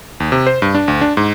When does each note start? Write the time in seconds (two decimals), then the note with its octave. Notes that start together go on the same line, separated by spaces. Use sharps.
0.20 D#2
0.32 C3
0.47 C5
0.62 G2
0.75 D4
0.88 D2
1.01 D4
1.17 G#2